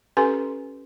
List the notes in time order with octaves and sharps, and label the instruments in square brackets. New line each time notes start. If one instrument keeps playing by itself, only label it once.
[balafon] C#4 G4 A4 B4 G#5 C6